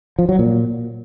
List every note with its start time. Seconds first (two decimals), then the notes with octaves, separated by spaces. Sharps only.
0.19 F3
0.29 F#3
0.39 A#2